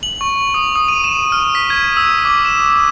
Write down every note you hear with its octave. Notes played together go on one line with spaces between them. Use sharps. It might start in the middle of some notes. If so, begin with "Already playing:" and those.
F#7
C#6
D#6
D#6
D#7
E7
F6
B6
G#6
E6
D6
E7